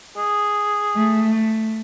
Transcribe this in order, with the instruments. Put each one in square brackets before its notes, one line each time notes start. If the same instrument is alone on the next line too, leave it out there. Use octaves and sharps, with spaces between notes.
[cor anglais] G#4
[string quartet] A3